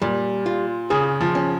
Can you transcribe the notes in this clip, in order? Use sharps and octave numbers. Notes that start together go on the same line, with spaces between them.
A#2 G3
F4
C#3 G#4
F3
C#4